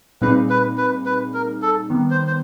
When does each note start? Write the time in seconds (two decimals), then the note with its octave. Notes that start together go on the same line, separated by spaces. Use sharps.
0.21 A#2 G3 C4 D#4 G#4 B4
0.50 B4
0.78 B4
1.06 B4
1.34 A#4
1.62 A4
1.90 D#3 G3 B3
2.11 C5
2.27 C5